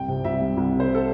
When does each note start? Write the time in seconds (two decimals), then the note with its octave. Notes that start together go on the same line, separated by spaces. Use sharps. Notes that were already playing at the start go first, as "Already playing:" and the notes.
Already playing: C2 G5
0.08 C3
0.24 C2 E5
0.40 G3
0.57 C2
0.74 C3
0.80 C5
0.94 A4